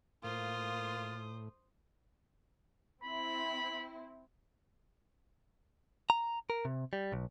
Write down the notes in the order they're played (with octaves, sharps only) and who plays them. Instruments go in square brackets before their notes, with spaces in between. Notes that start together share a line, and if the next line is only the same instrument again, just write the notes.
[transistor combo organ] A2 [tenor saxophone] A#3 [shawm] F4 [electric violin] C5 D#6
[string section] C4 E4 [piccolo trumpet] B5
[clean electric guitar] A#5
A#4
C3
G3
B1